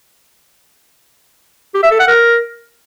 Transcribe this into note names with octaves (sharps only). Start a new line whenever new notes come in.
G4
E5
A4
F#5
A#4